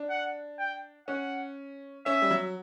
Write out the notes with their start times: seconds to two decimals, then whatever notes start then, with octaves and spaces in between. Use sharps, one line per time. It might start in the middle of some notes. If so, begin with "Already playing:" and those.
Already playing: D4
0.10 F#5
0.59 G5
1.08 C#4 F#5
2.06 C#4 E5
2.22 G3
2.31 F#3